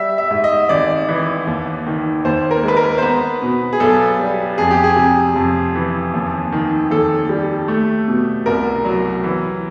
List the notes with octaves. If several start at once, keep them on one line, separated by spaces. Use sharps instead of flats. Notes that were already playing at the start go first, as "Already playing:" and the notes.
Already playing: G3 E5
E5
G#2
D#5
G#1 D5
E3
D#2
D#3
D#2 C5
A#4
G#3 B4
A#4
C5
B3 B4
B2
G#4
B1 A4
G3
F2 G#4
G4
G#4
C3
F2
E3
D#2
D#3
D#2 A4
G3
A3
B2
C2 A#4
F#3
E3